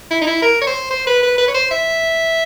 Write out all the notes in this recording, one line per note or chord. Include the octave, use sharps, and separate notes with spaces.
E4
D#4
E4
A#4
C#5
C5
C5
B4
B4
B4
C#5
C5
E5